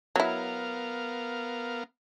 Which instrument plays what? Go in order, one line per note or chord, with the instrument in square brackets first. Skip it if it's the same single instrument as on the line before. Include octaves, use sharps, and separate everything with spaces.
[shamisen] F#3 E4 [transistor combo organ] B3 A#4 F5